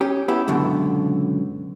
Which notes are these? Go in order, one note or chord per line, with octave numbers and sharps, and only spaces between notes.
C#4 G4
B3 E4 G4
C#2 F#2 B2 D3